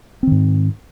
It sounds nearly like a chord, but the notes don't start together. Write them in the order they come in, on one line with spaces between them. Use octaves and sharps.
C4 D#3 G#2